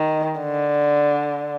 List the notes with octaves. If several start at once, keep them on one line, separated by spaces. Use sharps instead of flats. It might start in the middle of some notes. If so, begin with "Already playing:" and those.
Already playing: D#3
D3